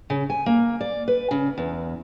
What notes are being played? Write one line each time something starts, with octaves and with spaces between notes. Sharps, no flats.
C#3
G#5
A#3
D5
B4
C#3
E2